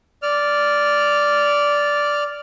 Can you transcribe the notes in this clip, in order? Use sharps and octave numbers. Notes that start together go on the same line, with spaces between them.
D5 F6